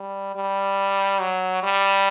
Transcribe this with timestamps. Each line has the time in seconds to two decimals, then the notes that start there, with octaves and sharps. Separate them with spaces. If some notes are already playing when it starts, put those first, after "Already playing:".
Already playing: G3
0.36 G3
1.21 F#3
1.63 G3